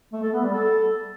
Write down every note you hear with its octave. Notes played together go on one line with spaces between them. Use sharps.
A3
A4
B3
G3
A4